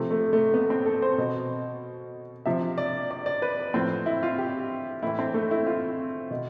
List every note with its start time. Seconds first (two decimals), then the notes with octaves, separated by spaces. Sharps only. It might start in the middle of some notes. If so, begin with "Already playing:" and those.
Already playing: C3 F3 A3
0.11 A3
0.33 A3
0.54 B3
0.70 C4
0.86 A4
1.02 C5
1.18 B2
2.46 C3 F3 E5
2.78 D5
3.11 D5
3.26 D5
3.42 B4
3.74 A2 F3 C4
4.06 E4
4.23 F4
4.38 G4
5.03 A2 E3 E4
5.19 C4
5.34 A3
5.51 E4
5.67 F4
6.31 B2